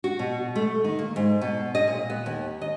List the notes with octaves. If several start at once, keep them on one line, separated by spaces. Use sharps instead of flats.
F#4
B2
A3
D#3
A#3
G#2
B2
D#5
A#2
B3
D#2
D#5